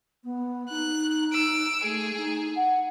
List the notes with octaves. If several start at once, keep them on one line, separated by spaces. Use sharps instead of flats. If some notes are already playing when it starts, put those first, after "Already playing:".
B3
D#4 F#6
E6 D7
A3 G#4
D#4
F#5